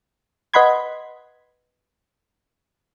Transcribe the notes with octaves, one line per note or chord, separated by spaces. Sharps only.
B4 D#5 F#5 B5 C6 G#6